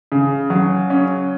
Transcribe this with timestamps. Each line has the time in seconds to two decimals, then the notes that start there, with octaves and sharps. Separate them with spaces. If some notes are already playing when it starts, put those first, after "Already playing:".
0.12 C#3
0.50 F#3
0.90 C#4